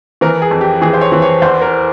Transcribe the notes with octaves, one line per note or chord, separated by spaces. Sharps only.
E3 A#4
G#4
F2
G4
E3 G#4
C5
C#5
E3
C#5
E2 C5
A#4